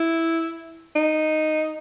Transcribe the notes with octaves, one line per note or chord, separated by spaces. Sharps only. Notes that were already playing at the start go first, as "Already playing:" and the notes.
Already playing: E4
D#4